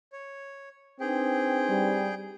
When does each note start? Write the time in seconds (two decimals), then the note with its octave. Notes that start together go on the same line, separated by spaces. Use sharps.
0.12 C#5
1.00 C4 D4 D#4 G#4 B4 G5
1.69 G3